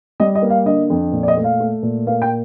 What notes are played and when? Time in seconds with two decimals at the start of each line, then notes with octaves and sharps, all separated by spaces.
0.20 G3 D#5
0.35 D#5
0.42 A#3
0.50 F5
0.65 D3 D#5
0.90 F2
1.12 A#2
1.23 D5
1.28 D#5
1.37 A3
1.44 F5
1.60 A3
1.83 A#2
2.07 A#3 F5
2.22 G5